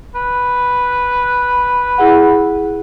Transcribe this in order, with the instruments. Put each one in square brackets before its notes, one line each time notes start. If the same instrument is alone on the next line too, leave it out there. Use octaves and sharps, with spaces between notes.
[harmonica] B4
[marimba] E4 G#4 F#5